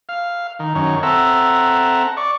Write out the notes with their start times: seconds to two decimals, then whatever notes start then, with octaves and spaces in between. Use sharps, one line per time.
0.09 F5
0.59 D#3
0.75 F#2 D#3 C#5
1.03 C4 A4 E5 F#5 A#5
2.17 D5 C#6